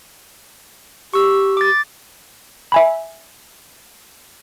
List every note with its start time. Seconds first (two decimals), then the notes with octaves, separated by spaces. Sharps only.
1.14 G4 C#6 E6
1.57 D6 A6
2.72 E5 G#5 B5